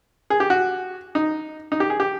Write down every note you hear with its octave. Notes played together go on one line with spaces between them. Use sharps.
G#4
G4
F#4
D#4
D#4
G4
G#4
G4